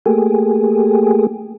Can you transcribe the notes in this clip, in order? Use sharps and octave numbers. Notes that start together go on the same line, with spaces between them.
A3 A#3 G4 G#4